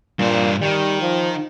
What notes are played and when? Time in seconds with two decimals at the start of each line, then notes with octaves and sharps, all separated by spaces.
0.19 G2 A#2 C5
0.61 D#3 G3
1.01 F3